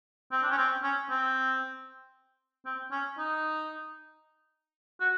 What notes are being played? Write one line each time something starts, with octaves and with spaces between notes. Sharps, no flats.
C4
D4
C#4
C4
C#4
C4
C4
C#4
D#4
F#4